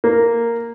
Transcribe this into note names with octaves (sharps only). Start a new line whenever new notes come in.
A#3